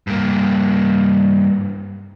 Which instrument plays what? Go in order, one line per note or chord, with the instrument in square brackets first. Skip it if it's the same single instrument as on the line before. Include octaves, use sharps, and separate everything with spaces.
[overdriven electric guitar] G2 A#3